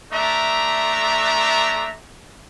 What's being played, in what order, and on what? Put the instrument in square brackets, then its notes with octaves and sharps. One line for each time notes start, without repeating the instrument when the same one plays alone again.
[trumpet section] A3 D4 E5 A#5